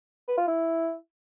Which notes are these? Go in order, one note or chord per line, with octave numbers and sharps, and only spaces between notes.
B4
F4
E4